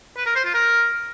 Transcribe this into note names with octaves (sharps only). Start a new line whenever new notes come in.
B4
A#4
C5
F4
A#4